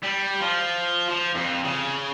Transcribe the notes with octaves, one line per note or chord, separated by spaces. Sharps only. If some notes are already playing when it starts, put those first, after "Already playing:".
G3
F3
F3
F2
C#3